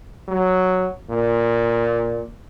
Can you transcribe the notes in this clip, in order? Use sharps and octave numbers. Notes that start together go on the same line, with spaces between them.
F#3
A#2